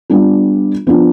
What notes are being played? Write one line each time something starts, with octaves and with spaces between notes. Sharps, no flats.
G3 B3 D4 F4
F3 B3 D4 F4